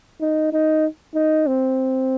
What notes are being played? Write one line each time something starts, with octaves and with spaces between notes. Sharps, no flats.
D#4
D#4
D#4
C4